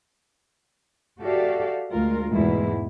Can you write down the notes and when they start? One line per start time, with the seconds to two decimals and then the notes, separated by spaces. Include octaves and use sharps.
1.21 F#4 G4 A4 D5 E5 F5
1.93 D2 G#3 F4 A#4
2.32 E2 G#2 B2 E3 G#3 E4